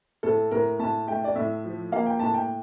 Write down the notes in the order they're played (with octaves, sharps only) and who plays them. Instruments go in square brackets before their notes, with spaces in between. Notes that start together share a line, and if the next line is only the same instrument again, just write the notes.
[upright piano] A2 A4
A2 A#4
A2 A5
A3 G5
D5
A2 E5
F3
A#3 F5
G5
A2 A5
G5